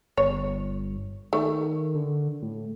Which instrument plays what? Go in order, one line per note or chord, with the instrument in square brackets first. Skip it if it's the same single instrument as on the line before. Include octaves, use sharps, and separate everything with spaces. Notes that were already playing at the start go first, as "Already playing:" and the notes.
[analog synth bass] G1 [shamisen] C#5
[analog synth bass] D#3 [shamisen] A3
[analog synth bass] D3
A2